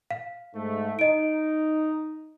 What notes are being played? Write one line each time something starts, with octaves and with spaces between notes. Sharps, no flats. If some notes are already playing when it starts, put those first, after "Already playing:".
F5
G#2 A3
D#4 D#5 D7